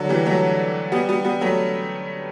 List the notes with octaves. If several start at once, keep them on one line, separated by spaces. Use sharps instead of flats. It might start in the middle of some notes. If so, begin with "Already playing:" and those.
Already playing: D3 F#3
E3 G3
F#3 A3
G3 B3
G3 B3
G3 B3
F#3 A3